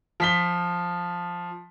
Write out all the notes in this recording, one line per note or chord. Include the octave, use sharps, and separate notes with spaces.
F3 B6 G7